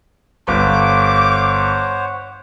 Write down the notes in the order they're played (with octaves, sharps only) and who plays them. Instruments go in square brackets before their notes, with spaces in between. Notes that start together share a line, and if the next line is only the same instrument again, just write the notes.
[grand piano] G1 [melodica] C5 C#5 F#5 [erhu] D6